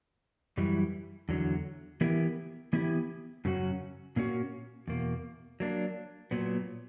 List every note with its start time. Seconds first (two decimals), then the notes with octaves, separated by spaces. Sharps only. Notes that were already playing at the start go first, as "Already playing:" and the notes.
0.57 F#2 E3 G3
1.29 E2 D3 F#3
2.01 E3 B3 E4 G4 A#4
2.73 E3 B3 E4 G4
3.45 F#2 C#3 F#3 C#4 F#4
4.16 A#2 A#3 C#4 F#4
4.88 E2 B2 A#3
5.60 F#3 A#3 D4
6.31 A#2 F#3 B3